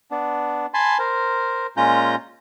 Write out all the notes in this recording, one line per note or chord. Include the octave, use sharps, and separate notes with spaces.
B3 D4
G#5 A5 B5 C6
A#4 C5
A#2 G#3 C#4 F4 A#5 G6